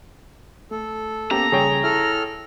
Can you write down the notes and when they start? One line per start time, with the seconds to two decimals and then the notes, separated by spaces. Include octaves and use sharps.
0.71 A3 A4
1.31 A#3 B3 C#4 G4 A#5
1.52 C#3 F3 G3 G#4 C#5 G5
1.84 E4 A4 F6